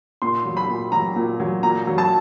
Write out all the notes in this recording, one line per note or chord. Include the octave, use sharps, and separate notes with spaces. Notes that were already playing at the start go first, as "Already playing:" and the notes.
A#2 C6
F#3
B5
A#2
F#3 A#5
A#2
F#3
A#2 A#5
F#3
A5